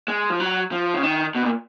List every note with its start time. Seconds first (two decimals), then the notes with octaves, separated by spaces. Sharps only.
0.08 G#3
0.30 F3
0.40 F#3
0.72 F3
0.94 C#3
1.03 D#3
1.35 B2
1.43 A#2